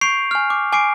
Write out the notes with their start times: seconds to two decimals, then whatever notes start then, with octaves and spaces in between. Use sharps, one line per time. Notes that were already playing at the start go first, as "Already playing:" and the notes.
0.01 C#6 G6 C7 D7 F7
0.31 G#5 F6
0.50 D6
0.73 G#5 D6 C7 D7